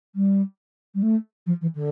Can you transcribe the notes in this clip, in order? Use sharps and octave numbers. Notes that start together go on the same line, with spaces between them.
G3
G3
A3
F3
E3
D3